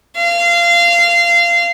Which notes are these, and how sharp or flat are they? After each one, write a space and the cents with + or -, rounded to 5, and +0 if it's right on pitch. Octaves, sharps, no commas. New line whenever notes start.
F5 -20